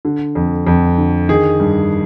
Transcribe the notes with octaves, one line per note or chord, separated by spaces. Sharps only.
D3
F2
F2
D3
D#3 G#4
G2